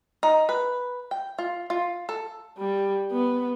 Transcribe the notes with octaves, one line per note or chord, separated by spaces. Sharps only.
D#4
B4
G5
F4
F4
A4
G3
B3